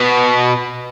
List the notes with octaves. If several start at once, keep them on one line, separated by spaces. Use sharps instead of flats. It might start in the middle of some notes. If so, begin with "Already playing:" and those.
Already playing: B2